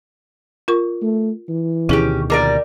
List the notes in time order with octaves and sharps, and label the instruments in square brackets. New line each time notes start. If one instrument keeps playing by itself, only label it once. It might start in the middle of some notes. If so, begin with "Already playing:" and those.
[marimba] F4 A#4 C#6
[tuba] A3
E3
[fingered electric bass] D2 B2 D#3 [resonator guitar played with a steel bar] C#4 G4 [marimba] E4 G#4
[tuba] A#1 [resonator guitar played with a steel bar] G3 A#4 D5 [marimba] D6